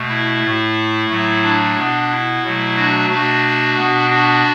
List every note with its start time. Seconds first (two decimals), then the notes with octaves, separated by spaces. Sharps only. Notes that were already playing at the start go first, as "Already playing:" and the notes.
Already playing: B2 A3
0.09 E4
0.43 A2 A3
1.09 A2 F#3 A3
1.43 D4
1.77 B2 B3
2.10 E4
2.43 B2 F#3 A3
2.77 D4 F#4
3.10 B2 A3 D4 F#4
3.77 B2 B3
4.10 D4 F#4